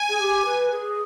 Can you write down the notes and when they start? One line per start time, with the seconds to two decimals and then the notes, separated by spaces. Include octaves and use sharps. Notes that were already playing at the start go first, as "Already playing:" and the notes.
Already playing: G#5
0.09 G#4
0.20 G4
0.45 B4
0.71 G#4